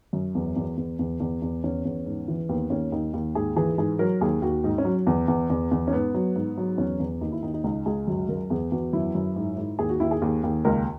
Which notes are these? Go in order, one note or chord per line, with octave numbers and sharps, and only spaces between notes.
F#2
E2
E2
E2
E2
E2
E2
E2 C#4
E2
G#2
E3
D#2 B3
D#2 C#4
D#2 D#4
D#2
G#2 G#4
E3 G#4
G#2 G#4
F#3 A#4
D#2 G#4
D#2 F#4
G#2 D#4
C#4
F#3
E2
E2
E2
E2
C#4
G#2 B3
F#3
G#2
F#3
E2 C#4
E2
D#2 D#4
E4
D#2 D#4
D#4
C#2 D#4
C#2 G#4
F#2 F#4
F#2 A#4
E2 G#4
E2 F#4
F#2 E4
F#2
G#2
G#2
D#2 G#4
F#4
D#2 E4
G#4
D#2
D#2
C#2 A#4